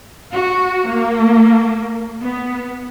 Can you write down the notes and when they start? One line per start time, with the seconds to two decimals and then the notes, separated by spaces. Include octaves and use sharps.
0.32 F#4
0.88 A#3
2.21 B3